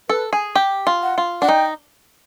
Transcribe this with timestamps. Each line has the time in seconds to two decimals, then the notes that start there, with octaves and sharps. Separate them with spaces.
0.09 A4 B4
0.33 G#4
0.55 G4
0.87 F4
1.02 F#5
1.18 F4
1.42 D4 F#5
1.48 D#4 G5